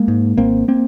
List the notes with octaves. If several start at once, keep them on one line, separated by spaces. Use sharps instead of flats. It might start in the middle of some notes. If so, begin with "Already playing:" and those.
Already playing: G#3 A#3
G#2
G#1 A#3 C4
A#3 C4